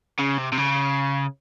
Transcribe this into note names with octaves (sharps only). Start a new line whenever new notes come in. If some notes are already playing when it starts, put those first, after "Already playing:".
C#3
C3
C3
C#3